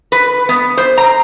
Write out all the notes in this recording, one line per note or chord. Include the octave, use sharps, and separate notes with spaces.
B4
B3
C5
A#5